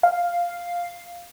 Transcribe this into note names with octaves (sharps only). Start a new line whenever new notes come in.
F5